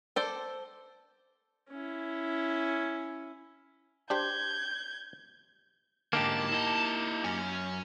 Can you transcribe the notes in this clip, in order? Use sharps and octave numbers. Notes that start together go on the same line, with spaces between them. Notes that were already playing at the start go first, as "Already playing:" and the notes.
A4 C5 D5
C#4 E4
D4 G4 C5 G6 G#6
G#2 D3 A#3 D#4 G4 A5
E4 D#5
F#2 C#4